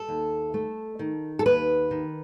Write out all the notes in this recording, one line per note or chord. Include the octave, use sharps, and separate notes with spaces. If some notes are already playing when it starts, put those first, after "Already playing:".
Already playing: A4
D#2
A3
D#3
A4
D#2 B4
D#3